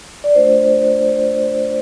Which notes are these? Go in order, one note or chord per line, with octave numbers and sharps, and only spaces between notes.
D5
A3 D4 F4 C5